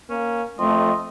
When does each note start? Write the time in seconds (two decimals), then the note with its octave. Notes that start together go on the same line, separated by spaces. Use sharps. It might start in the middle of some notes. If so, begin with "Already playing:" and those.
0.10 A#3 C#4
0.59 F2 A3 D#5 C6